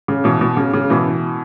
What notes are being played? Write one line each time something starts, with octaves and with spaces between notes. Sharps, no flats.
C#3
B2 E3
B2
C#3
C#3
B2 E3